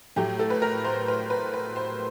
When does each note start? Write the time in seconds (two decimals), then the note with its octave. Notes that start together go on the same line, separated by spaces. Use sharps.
0.16 A2 F#3 A3 G4
0.39 A4
0.50 B4
0.62 A#4
0.84 C5
1.08 B4
1.30 B4
1.54 B4
1.76 C5